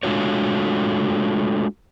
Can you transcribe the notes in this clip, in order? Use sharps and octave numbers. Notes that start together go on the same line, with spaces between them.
G#3 A3 D4 F4 F#4 C#5